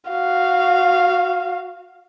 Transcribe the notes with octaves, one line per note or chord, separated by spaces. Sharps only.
F#4 F5